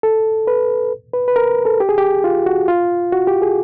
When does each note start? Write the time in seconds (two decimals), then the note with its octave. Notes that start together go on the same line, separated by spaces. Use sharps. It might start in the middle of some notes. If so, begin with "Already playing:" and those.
0.03 A4
0.47 B4
1.13 B4
1.28 B4
1.36 A#4
1.65 A4
1.80 G4
1.89 G#4
1.98 G4
2.24 F4
2.46 F#4
2.68 F4
3.12 F#4
3.27 G4
3.42 G#4